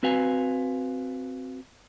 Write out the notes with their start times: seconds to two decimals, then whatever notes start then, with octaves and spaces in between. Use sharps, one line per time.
0.03 C4 F#4 B4 F5 G#5